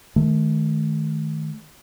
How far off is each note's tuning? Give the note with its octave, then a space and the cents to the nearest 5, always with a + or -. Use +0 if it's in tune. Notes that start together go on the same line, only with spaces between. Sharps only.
D#3 +0 A3 -30